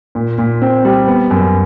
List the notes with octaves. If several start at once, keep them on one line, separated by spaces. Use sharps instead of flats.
A#2
A#2
C4
G3
B3
F#2